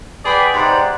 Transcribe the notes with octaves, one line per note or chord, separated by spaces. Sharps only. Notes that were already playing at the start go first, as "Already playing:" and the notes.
G#4 B4 D5 F#5 G5 B5
G#2 C3 D5 F#5 G5